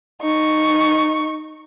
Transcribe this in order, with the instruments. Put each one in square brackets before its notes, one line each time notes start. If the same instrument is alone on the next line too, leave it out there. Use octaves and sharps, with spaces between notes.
[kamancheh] D#4 C#6